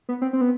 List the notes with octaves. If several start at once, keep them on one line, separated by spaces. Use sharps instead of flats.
B3
C4
C4
B3